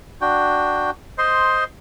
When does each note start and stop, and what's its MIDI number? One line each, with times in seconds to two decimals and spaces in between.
0.21 0.90 62
0.21 0.90 66
0.21 0.90 79
1.18 1.64 72
1.18 1.64 75
1.18 1.64 84